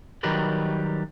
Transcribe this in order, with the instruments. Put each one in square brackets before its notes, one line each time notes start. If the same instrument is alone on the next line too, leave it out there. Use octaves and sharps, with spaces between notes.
[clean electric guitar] D#3 F#3 G3 G4 A#4 B4